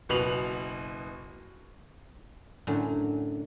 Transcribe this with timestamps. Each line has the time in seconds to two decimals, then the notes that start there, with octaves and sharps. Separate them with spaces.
0.09 F#1 B2 B4 F7 F#7
2.67 F#2 A2 D3